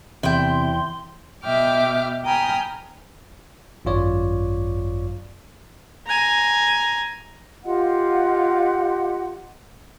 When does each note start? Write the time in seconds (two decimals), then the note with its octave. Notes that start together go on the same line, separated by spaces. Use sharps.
0.23 E2 C3 E4 G5 C6
1.43 B2 D#5 E5 G5 D6 F6
2.24 G5 G#5 A#5 B5 D#6 F6
3.85 G#1 F#2 F4 C#5 D5
6.06 G#5 A#5
7.64 F4 G4 D#5 F#5